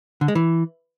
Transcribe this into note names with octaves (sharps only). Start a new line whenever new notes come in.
D3
G#3
E3